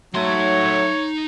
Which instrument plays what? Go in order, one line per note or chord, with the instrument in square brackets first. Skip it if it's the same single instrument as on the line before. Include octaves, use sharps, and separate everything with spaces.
[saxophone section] F#3 A3 [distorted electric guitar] D#4 C6 [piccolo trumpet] C#5